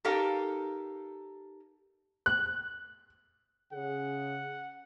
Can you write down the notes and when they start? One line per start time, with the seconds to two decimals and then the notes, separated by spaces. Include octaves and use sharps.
0.05 D#4 G4 A4 A#4 F5
2.26 F#6
3.72 C#3 G#4 F#5